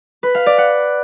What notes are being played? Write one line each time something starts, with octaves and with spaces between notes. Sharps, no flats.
B4
F5
D5
F#5